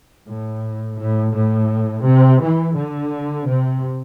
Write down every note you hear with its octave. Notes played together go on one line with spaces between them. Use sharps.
A2
A2
A2
C3
E3
D3
C3